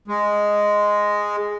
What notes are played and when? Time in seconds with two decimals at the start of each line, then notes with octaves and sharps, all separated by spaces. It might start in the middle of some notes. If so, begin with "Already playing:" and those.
0.08 G#3